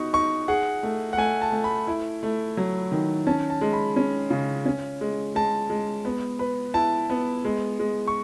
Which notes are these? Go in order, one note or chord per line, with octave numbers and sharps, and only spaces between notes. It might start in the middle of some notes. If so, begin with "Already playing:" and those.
Already playing: B3 D#4 F#4 C#6
D#4 C#6
G#4 F#5
A3
F#5
A3 G#5
A5
A3
B5
E4
A3
F#3
D#3
C#4 A5
A5
G#3
B5
C#4
C#3
C#4
G#3
G#3 A5
G#3
B3
B4
E4 A5
B3
G#3
G#3
C#6